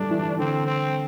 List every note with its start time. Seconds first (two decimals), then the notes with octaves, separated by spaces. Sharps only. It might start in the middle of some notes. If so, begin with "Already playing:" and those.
Already playing: G3 A3 D4
0.10 E3
0.39 D3 C4
0.67 C4